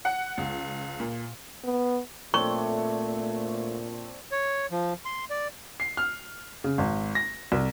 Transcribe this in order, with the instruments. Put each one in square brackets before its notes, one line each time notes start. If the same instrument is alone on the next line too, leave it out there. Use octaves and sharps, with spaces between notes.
[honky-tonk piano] F#5
C#2
A#2
[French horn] B3
[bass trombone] A#2 [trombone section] A3 [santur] C4 D4 C#5 [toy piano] C#6
[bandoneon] C#5
F3
C6
D5
[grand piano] C7
F6
C#3
G#1
A#6
C2